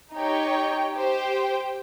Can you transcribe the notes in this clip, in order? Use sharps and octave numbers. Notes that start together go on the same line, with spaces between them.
D#4 G4 C#5 G5
G4 C5 G5